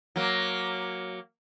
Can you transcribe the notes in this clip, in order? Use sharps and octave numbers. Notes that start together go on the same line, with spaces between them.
F#3 A#3